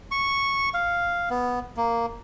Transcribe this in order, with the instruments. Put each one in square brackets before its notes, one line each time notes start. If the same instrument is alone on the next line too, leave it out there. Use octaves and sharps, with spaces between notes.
[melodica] C#6
F5
B3
A#3